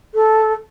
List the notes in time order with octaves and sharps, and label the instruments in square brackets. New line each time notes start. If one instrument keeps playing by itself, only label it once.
[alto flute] A4